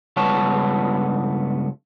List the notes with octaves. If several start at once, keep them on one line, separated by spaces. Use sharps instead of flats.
C#2 G2 B3 C#5 A5